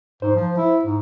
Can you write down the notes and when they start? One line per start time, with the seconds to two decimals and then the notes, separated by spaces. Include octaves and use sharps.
0.22 G#2 C5
0.35 F3
0.57 E4
0.85 G#2